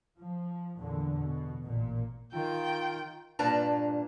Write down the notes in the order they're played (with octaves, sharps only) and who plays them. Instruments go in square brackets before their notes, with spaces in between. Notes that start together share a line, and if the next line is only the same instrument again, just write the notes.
[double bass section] F3
E2 A#2 D3
B2
A1 A#2
[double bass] D#3 [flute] F4 [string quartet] G5
[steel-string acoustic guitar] G2 A#2 D4 B4 A5 A#5